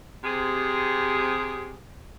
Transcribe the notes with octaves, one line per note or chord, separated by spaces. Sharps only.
C3 G#4